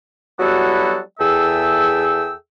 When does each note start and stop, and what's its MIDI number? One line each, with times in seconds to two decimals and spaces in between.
0.38 0.98 54
0.38 0.98 55
0.38 0.98 59
0.38 0.98 64
0.38 0.98 66
0.38 0.98 69
1.19 2.32 40
1.19 2.32 68
1.19 2.32 69
1.19 2.32 76
1.19 2.32 79
1.19 2.32 88